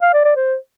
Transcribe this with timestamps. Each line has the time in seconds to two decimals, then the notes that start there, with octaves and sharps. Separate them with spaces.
0.02 F5
0.13 D5
0.25 D5
0.36 C5